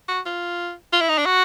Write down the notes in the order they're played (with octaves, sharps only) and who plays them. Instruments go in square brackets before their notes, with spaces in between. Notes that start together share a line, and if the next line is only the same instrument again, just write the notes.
[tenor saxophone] F#4
F4
F4
E4
D#4
D4
F#4